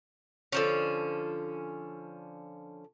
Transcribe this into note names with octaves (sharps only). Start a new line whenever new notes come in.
D3 F3 C#4